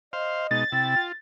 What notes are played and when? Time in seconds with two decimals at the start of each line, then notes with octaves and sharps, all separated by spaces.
0.13 C5 D#5 F5
0.51 B2 G#3 D#4 A6
0.72 C3 E4 G5
0.96 F4